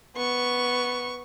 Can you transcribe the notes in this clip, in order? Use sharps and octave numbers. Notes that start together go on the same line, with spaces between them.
B3 C#6